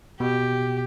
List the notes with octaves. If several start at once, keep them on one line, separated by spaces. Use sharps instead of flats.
B2 G4